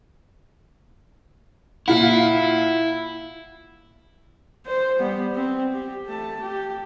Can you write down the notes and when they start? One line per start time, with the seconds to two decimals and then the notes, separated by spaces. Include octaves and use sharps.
1.88 A#2 E4 F4 F#5
4.67 C5
4.99 G3 B3
5.35 C4
5.73 G4
6.05 A3 A5
6.41 G4